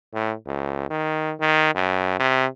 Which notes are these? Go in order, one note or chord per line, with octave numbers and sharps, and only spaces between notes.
A2
C#2
D#3
D#3
F#2
C3